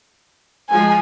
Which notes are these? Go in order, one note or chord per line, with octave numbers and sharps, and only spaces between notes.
F3 G#3 G#5